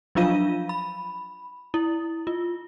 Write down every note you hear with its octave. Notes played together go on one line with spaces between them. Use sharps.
F3 F#3 D4 F4 F5 D#7
B5
E4
F4